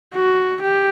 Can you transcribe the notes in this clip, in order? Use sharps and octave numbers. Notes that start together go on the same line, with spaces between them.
F#4
G4